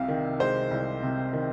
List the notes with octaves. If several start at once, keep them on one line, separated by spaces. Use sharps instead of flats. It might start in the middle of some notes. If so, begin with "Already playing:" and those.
Already playing: C2 C3 F5
D#3
G#3 C5
C2
C3
D#3